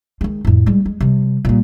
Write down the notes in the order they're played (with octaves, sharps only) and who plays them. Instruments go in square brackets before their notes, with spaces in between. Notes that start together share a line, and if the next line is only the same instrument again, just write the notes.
[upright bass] D#3 G#3
F2 A2
G3 G#3
G#3
C3 G3
A#2 G3